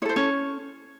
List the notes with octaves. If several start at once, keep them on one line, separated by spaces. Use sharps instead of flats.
E4 A4 C5 C#5
C#4 C#5